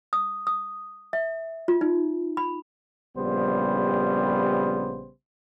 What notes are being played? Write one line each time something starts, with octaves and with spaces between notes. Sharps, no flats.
D#6
D#6
E5
F4
D#4
B5
A#1 C#3 G3 B3 G4 C5